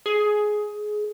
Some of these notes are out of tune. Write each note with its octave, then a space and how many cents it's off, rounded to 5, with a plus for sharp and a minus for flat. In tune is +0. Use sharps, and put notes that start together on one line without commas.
G#4 +15